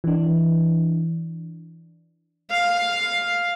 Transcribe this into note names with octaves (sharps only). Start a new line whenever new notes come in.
E3 D4
F5